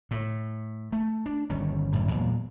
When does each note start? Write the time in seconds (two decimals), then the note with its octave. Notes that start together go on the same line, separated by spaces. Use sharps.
0.11 A2
0.92 A3
1.26 D4
1.50 G1 D#3 G3 C#4
1.92 F#1 F#2 A2 D3
2.08 E2 A#2 F#3 G#3